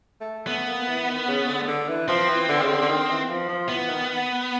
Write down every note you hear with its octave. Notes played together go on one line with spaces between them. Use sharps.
A3
A3 B3
A#3
E3
D#3
C#3
D3
D3
E3
F3 C4
E3
D3
C#3
D3
D3
D#3
E3
F3
F3
E3 B3
D#3